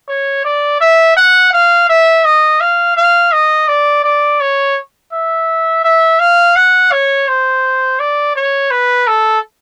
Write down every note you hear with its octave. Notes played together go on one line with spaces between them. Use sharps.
C#5
D5
E5
F#5
F5
E5
D#5
F5
F5
D#5
D5
D5
C#5
E5
E5
F5
F#5
C#5
C5
D5
C#5
B4
A4